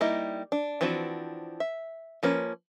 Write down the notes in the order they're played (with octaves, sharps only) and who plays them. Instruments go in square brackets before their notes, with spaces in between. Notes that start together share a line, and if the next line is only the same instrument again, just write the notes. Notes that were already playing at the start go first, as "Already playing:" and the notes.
[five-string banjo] G3 A#3 D#4 E4 D#5
D4
E3 F3 C4 D4 F#4
E5
F3 A#3 C#4 B4